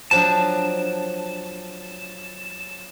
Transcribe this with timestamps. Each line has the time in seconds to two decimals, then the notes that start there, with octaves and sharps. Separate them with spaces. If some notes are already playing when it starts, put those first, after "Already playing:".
0.11 F3 F#3 D4 A5